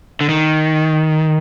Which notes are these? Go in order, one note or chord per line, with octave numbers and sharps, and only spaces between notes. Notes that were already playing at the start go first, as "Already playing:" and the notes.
D3
D#3